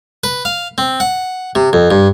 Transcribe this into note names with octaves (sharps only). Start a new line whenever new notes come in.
B4
F5
C4
F#5
C3
F2
G2